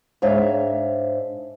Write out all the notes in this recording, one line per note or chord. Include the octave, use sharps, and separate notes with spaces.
G#2 D4 C#5 E5 F5